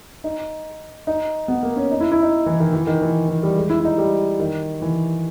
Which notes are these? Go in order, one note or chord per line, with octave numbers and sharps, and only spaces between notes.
D#4
D#4
B3
A#3
C#4
D#4
E4
E4
D#4
E3
D#3
E3
D#3
E3
E3
G3
G#3
E4
E4
D#4
G3
D#3
E3